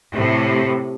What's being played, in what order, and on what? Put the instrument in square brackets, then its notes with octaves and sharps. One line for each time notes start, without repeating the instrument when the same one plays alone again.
[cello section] A2 C3